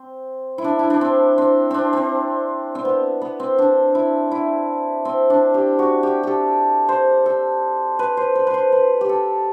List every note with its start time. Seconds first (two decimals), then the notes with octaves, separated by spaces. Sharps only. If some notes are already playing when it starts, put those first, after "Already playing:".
Already playing: C4
0.58 E4
0.64 D4
0.79 E4
0.90 D4
1.01 C4
1.38 C4
1.71 C4 D4
1.93 C4
2.75 C4
2.85 B3
3.21 B3
3.40 C4
3.58 D4
3.95 E4
4.31 E4
5.05 C4
5.30 D4
5.54 G4
5.79 F#4
6.03 G4
6.23 G4 A4
6.89 C5
7.26 A4
7.99 B4
8.17 C5
8.35 B4
8.47 B4
8.54 C5
8.72 B4
9.01 G4
9.09 A4